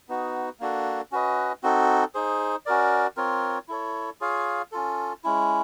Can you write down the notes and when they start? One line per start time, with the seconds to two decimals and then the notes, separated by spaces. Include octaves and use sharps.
0.09 B3 D#4 F#4
0.60 A#3 D4 F#4 A4
1.12 C#4 F#4 B4 D#5
1.63 C4 D#4 F#4 A4
2.15 D#4 G#4 C5
2.66 C#4 F#4 A#4 D5
3.17 C4 F4 A#4 C#5
3.68 E4 A4 C#5
4.21 F4 G#4 C#5 F5
4.72 C#4 F4 A4
5.24 G#3 C#4 E4